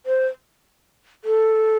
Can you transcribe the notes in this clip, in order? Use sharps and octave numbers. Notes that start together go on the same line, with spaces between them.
C5
A4